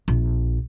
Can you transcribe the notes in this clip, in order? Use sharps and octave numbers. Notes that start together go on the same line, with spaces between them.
A#1